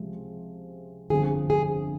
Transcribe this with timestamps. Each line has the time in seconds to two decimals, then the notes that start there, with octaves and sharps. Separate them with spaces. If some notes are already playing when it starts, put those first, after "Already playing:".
Already playing: C#2 C3 F3 G#3 C4
1.10 G1 F2 D3 F3 G#4
1.50 G#4